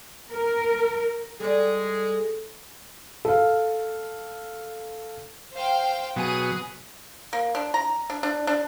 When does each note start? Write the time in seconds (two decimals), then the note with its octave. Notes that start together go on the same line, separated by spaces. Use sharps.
0.32 A#4
1.40 G3 G#3 G#4 A4 D5
3.25 A4 F5
5.53 C5 F5 G5
6.16 B2 F#3 G#4
7.33 A#3
7.55 D4
7.74 A#5
8.10 D4
8.23 D4
8.47 D4